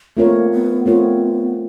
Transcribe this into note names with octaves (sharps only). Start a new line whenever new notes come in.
A3 A#3 C4 F4 A#4 C#5
B3
A3 B3 C4 F4 A#4 C#5